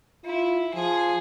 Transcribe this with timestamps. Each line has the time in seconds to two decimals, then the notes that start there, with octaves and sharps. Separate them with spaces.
0.25 E4 F4
0.74 F3 G#4